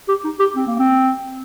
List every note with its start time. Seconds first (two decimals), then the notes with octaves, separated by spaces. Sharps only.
0.08 G4
0.24 D#4
0.40 G4
0.56 C4
0.67 A#3
0.79 C4